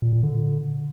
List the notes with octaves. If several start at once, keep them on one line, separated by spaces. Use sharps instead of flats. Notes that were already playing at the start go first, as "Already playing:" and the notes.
A#2
A#2
D3